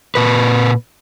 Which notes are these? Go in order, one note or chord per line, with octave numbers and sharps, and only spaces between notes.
A#2 B4